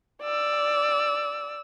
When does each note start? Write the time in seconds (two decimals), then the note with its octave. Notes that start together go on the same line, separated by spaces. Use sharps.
0.22 D5 E6